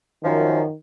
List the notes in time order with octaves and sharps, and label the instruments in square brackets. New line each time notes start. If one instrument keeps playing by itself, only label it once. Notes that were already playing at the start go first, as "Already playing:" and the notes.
[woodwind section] F#2 F3 [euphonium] D#3